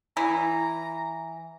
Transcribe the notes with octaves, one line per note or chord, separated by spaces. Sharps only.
E3 A#5